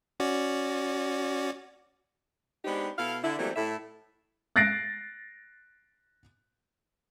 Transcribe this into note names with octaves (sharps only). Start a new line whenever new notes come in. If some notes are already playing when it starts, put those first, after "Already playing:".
C#4 F#4 D5
G#3 B3 C4 D4 D#4 G4
B2 E4 A4 F5
D3 E4
E3 F#3 G3 A3 A#3 C4
A2 E4 E5
F#6 A6 A#6 C7 D7